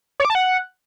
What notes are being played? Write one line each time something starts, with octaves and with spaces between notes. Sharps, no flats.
C#5
D6
A5
F#5